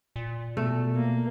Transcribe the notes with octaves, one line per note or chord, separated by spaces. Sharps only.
A#2
B2 A3
A#3